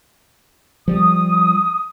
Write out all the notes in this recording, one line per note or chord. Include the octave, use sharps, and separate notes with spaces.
F3 G3 D#6